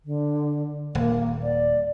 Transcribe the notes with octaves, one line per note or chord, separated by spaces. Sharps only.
D3
D#1 A#3
D5